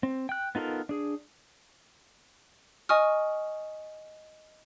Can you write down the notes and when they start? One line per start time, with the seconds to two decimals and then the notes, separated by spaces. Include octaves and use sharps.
0.03 C4
0.29 G5 F#6
0.55 B3 D#4 F4 A4 A#4
0.89 D4 G#4
2.89 D#5 G#5 C#6 D#6 F6